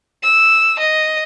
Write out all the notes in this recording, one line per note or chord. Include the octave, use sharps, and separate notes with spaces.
E6
D#5